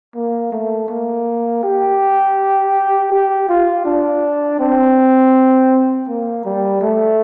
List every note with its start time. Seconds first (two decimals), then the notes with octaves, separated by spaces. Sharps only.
0.15 A#3
0.52 A3
0.88 A#3
1.63 G4
3.12 G4
3.49 F4
3.85 D4
4.60 C4
6.08 A#3
6.45 G3
6.82 A3